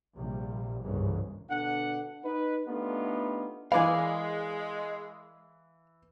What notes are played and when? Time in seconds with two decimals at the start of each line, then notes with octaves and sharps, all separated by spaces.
0.15 A#1 C3 G3
0.84 G1 C2 G#2 C#3 E3
1.50 B2 D3 D4 F#5
2.25 D#4 B4
2.67 A3 B3 D4 D#4 F4 G4
3.72 E3 G#3 A#4 B4 D5 F5 G#5